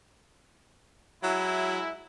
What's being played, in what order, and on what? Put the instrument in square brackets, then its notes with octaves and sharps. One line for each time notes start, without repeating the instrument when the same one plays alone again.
[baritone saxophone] F#3 [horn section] G#3 E4